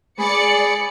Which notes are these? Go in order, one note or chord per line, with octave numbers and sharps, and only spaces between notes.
G#3 G#4 D5 B5 C#7